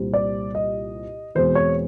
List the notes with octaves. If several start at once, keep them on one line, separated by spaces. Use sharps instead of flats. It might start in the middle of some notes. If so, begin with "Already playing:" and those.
Already playing: C2 A#2 G3 C4
D5
D#5
E2 B2 G#3 C4 C5
C#5